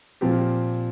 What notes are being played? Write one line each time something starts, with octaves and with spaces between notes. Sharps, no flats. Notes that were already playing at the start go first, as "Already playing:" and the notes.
A#2 F3 C4 G4